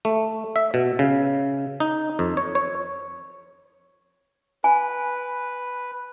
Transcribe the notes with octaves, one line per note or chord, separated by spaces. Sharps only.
A3
E5
B2
C#3
D#4
F2
C#5
C#5
B4 G#5